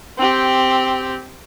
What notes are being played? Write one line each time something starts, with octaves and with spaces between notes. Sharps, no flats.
C4 G4